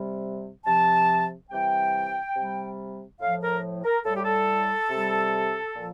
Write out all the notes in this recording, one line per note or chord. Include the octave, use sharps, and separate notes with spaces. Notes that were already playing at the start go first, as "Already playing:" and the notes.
Already playing: C3 G3
C3 F3 A5
C3 E3 G3 G5
C3 G3
A2 F3 F5
A#4
A#4
A2 G3 A4
G4
A4
C3 G3
A#2 F3